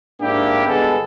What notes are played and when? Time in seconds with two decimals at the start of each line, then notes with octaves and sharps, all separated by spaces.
0.21 G#2 A#3 D4 E4 G4
0.67 G1 G#3 B3 A4